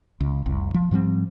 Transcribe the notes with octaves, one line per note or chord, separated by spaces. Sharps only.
C#2
F1 C2
F3
G#2 F3 G3 C4